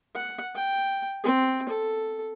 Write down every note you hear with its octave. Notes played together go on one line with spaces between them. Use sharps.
F#5
G5
C4
A4